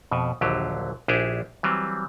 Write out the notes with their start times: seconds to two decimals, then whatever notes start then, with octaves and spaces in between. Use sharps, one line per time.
0.11 F2 B2
0.41 A#1 D#2 D3 F#3 G4
1.08 A#1 D4 E4 G4 G#4
1.63 E3 F#3 G3 C4